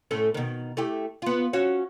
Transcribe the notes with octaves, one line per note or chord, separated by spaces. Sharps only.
A2 A3 C#4
B2 D#3
A3 E4 G4
B3 F4
C#4 F#4 C#5